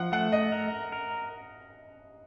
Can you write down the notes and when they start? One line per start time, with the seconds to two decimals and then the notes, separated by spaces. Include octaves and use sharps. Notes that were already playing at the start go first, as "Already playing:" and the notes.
Already playing: F3 F#5
0.12 A3 F#5
0.32 D#5
0.52 A#4
0.92 A#4